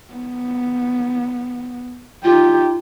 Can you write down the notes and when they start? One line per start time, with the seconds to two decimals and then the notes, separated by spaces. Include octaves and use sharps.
0.14 B3
2.24 D#4 F4 G4